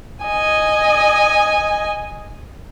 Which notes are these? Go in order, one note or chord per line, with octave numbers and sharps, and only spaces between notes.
D#5 G#5